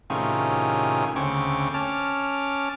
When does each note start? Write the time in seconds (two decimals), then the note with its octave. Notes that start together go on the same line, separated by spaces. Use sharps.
0.10 A2 C3 D#3 C#4 F4 G#4
1.16 D2 C#3 C4 C#6 D6
1.74 C#4 A5 D6 F6